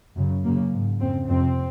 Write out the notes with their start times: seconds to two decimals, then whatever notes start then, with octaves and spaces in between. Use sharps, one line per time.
0.16 F#2 C#3
0.44 F#2 C#3 A#3
0.73 G#2
1.00 F2 C#3 C4
1.28 F2 C3 C4